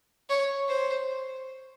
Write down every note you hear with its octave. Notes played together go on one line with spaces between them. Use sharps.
C#5
C5